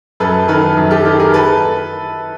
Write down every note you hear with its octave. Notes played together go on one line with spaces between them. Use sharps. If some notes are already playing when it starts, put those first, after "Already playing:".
F#2 A4 B4
D#3 A4 B4
F#2
G4 A4
D#3 G4 A4
G#4 A#4
A4 B4